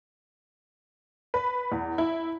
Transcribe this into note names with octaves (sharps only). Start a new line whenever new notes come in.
B4
E2
E4